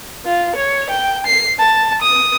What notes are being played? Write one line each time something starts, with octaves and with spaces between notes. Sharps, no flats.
F4
C#5
G5
C7
A5
D#6